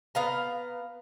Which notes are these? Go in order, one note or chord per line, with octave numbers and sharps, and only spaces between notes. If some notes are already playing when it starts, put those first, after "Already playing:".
B3 F5 A#5